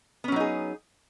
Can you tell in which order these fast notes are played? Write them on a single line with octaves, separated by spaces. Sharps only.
B3 C#4 F#3 D#4 G#4